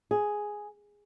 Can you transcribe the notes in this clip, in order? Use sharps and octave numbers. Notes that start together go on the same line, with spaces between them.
G#4